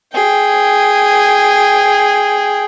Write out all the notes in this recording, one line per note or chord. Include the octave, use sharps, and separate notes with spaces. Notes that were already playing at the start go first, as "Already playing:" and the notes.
G#4 G5